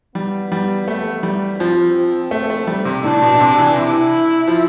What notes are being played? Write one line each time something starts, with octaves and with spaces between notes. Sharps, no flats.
G3 B3
G3
A3
G3
F3 C4
A3
A3
G3
C3
A2 D4
B2
C3
E3
C3 E4
F3